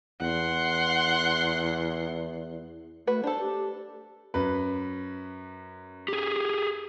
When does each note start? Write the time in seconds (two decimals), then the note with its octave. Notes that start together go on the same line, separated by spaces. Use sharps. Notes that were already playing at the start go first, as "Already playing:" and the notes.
0.21 E2 F#5 C6
3.07 A3 F#4 B4
3.24 D4 A4 C5
3.39 G4
4.34 F#2 B4
6.08 G4 G#4